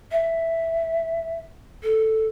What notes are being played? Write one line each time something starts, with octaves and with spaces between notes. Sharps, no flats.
E5
A4